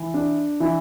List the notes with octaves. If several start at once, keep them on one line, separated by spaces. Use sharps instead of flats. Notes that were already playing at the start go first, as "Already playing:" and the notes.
Already playing: E3
D4
E3